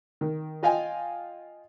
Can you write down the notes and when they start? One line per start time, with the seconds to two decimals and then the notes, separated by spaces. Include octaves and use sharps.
0.21 D#3
0.63 F4 D#5 F5 G5 G#5